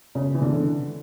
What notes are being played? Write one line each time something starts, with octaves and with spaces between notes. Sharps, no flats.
C#3
E3
D3